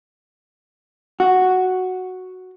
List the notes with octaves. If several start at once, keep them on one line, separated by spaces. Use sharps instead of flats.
F#4